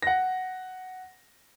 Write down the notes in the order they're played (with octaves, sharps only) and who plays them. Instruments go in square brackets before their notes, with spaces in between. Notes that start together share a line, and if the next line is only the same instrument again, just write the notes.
[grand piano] F#5 A#6